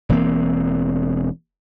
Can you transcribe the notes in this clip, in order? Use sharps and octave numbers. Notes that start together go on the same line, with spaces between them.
E1 E3 A#3 C4